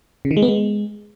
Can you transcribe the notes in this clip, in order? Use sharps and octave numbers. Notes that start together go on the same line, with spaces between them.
C#3
D#3
G#3
B3
G#3